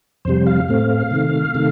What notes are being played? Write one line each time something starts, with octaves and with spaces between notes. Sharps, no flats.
F2 C3 G3 C5
F5
A2 A3 C4 F5
C3 D#3 A3
C3 D#3 A3